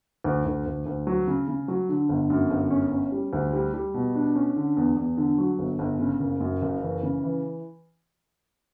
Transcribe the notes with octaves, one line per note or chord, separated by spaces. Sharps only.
D2
D2
D2
D2
F#3
C#3
C#3
F#3
D3
G1
F#2
G1
C#4
C#4
G3
D2
G3
G3
B2
D4
C#4
D3
E2
E2
D3
F#3
G1
G1
C#3
F#1
F#2
F#1
E3
C#3
E3